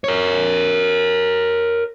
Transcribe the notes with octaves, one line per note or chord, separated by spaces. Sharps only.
A#4 C#5